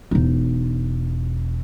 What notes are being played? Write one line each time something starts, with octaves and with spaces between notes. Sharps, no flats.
E1 D#4